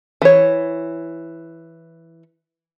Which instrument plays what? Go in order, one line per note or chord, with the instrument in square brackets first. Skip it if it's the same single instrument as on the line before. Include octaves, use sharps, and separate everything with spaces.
[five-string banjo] E3 C#5